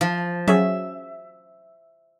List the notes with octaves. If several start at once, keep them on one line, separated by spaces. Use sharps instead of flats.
F3
F#3 C#4 G#4 E5